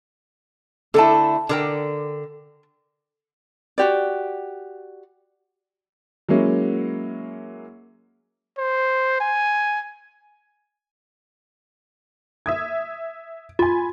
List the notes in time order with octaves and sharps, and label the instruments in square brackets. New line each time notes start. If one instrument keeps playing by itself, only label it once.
[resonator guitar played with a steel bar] D3 A3 E4 [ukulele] A4 A5
[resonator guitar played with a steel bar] D3 A#4 G5
[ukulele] F#4 G4 D5
[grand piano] F#3 G#3 A#3 C#4 E4
[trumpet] C5
G#5
[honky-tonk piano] E5 D#6 G#6
[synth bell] F4 [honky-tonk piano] G#5 B5